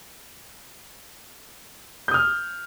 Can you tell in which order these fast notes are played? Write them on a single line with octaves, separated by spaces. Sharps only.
G6 D#6 F6